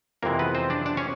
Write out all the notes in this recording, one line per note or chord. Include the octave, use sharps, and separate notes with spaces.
F2 C3 E3 G#3 A#3 A#4
B3 B4
C4 C5
D4 D5
D4 D5
C#4 C#5